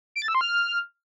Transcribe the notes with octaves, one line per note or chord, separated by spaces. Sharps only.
D7
A6
E6
C6
F6